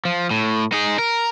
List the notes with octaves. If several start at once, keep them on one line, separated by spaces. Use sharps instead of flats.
F3
A2
D#4 G#4
A#4